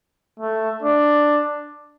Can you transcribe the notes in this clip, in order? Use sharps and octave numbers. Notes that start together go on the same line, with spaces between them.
A3
D4